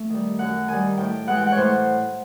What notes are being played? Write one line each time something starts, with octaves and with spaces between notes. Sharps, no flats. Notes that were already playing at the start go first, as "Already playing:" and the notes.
Already playing: A3
D#3 G3
F#2 F#5
D#3 G3 G#5
A2 G5
E3 G#3 F#5
G5
F#5
C#5
A2 C5